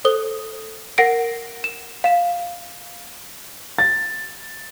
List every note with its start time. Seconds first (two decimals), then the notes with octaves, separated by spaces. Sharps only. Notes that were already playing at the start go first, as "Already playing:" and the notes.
0.05 A4 C5 D#6 G7
0.98 A#4 F#5 A#6 C7 D7
1.64 E7
2.04 F5 E7
3.78 A6